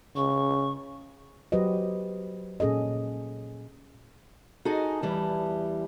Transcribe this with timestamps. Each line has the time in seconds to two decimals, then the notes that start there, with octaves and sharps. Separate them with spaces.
0.15 C#3 C#6
1.52 F#3 F#4 G4 B4 C5 D#5
2.60 A#2 C#4 G#4 A4 D#5
4.65 D#4 F#4 G#4 A4 D#5 G#5
5.02 E2 E3 G3 A5